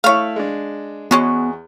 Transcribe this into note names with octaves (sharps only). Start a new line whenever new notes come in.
A3 E4 C#5 F5
G#3 D4
E2 G#3 B3 C#4 F#4